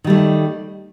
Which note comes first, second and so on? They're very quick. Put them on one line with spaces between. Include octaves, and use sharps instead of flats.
D#3 G3 A3